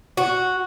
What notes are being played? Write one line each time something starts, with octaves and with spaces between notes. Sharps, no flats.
F#4